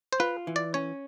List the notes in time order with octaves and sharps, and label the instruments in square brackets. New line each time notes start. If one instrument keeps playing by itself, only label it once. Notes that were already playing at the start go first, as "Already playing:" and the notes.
[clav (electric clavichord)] C5
[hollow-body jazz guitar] F4 [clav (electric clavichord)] B4
[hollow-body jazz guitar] E3
[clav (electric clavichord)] D5
[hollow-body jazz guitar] C#4 [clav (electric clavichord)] C#5